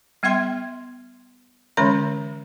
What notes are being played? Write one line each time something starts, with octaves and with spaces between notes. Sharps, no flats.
G3 B3 E5 G5 C6
D3 E3 G#3 C#4 C#5 A#5